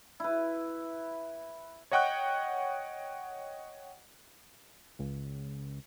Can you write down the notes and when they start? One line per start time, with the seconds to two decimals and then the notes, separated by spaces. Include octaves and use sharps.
0.20 E4 B4
1.91 C#5 D#5 F#5 G5 C#6 F#6
4.99 C#2